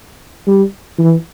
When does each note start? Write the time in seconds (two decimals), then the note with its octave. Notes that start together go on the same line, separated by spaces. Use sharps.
0.47 G3
0.99 E3